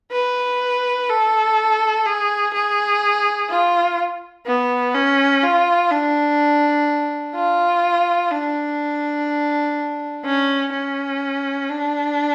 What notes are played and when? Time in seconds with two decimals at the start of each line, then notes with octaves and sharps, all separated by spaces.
0.12 B4
1.09 A4
2.06 G#4
2.54 G#4
3.49 F4
4.46 B3
4.94 C#4
5.43 F4
5.91 D4
7.35 F4
8.31 D4
10.25 C#4
10.73 C#4
11.70 D4